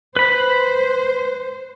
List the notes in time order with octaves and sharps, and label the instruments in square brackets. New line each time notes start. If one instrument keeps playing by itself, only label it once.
[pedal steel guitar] B4 B5 [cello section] C5